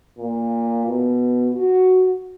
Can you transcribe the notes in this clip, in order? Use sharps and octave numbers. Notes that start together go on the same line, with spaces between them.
A#2
B2
F#4